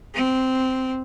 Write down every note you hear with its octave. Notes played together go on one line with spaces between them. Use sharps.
C4